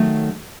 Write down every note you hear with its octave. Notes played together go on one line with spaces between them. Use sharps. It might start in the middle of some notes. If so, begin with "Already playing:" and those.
Already playing: D#3 F#3 A3